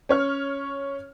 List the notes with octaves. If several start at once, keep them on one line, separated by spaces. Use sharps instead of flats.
C#4 C#5 F6